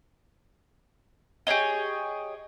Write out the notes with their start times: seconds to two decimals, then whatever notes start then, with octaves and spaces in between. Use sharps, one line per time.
1.47 G4 G#4 C#5 D#5